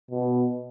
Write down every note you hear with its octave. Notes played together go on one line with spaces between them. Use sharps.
B2